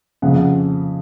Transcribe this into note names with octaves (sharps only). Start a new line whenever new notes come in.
F2 C#3 F#5